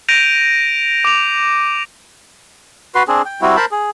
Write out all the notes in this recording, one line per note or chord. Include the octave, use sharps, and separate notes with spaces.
G6 A#6 D7 D#7 F7
D6 F7
F#4 B4 C6
C4 D4 G#4
G5
G3 C4 E4 F#4
A#4 C5 A5 B5
G#4